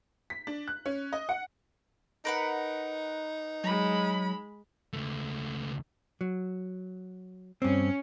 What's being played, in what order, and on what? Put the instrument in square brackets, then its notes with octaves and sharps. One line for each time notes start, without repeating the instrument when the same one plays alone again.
[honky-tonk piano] B6
D4
F#6
C#4
D#5
F#5
[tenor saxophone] D#4 [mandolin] A#4 B4 F#5
[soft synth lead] F#3 [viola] G#3 B5
[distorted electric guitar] C#2 A3
[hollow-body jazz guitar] F#3
[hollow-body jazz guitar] G2 C4 [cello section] C#4